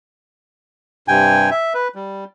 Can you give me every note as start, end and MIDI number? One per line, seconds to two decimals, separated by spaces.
1.08 1.50 43
1.08 1.50 48
1.08 1.50 79
1.08 1.50 80
1.51 1.73 76
1.74 1.88 71
1.95 2.24 55